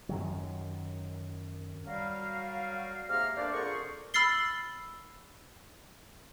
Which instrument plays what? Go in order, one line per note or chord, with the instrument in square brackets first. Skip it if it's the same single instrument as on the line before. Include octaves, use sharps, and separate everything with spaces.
[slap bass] F#2 D#3 F#3
[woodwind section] F#3 G3 A#4 F5
G#2 C3 A#3 F5 A#5 F6
A3 A#3 D4 C5 D5
F2 D3 G#4 A#4 C5 C#6
[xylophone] B5 E6 F6 A6 C7 G7